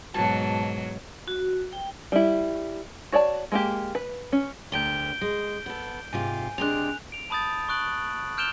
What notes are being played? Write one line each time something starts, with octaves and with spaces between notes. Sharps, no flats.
G#2 B2 F#3 A5
F#4
G5
G3 E4
F#4 C#5 D5 A5
G#3 A#3 G4
B4
C#4
D2 G4 A#4 G6 D7 G7
G#3
B3 A4
G#2 C3 F4 G#5
C3 G#3 D4 F#6 F7
D7 F7
A5 B5 D#6 G6 A6
C#6 D#6 F#6 D7 F#7
F6 G6 D7 E7 F7 G7